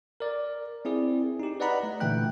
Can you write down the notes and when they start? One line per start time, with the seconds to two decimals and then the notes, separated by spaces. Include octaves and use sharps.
0.20 A#4 D5
0.85 C4 E4 G#4 D5
1.40 D#4 G4
1.60 B4 D5 D#5 F#5 A#5 B5
1.83 A3
2.00 A#2 D3 E3 A3 G5 F#6